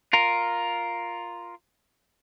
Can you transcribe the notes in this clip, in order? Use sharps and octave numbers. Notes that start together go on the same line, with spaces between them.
F4 A#4